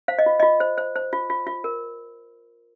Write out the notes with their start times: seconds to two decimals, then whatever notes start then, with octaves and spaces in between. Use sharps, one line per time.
0.08 C5 F5
0.19 D#5
0.26 F4
0.40 F4 D#5
0.60 C5
0.78 C5
0.96 C5
1.13 F4
1.30 F4
1.47 F4
1.64 A#4